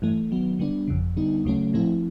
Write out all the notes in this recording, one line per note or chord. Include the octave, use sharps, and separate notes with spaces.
G2 E3 A3
D#3 F#3 B3
D3 G3 B3 D4
G1 F2 C#3
D3 G3 B3 D#4
D2 C#3 F#3 A3 C#4
A2 F3 A3 C4 E4